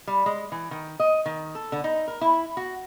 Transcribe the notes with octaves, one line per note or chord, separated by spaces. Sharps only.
G3
G#3
E3
D#3
D#5
D#3
A4
D3
D#4
A#4
E4
F#4